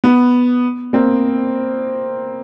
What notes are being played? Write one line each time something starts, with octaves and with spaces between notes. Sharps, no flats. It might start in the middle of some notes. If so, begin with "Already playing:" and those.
B3
A#3 C4